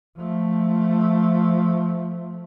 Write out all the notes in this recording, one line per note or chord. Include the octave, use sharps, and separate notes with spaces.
F3 A3